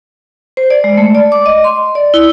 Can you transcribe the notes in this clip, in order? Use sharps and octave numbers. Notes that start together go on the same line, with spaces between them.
C5
D5
G#3
A3
D5
D6
D#5
C6
D5
E4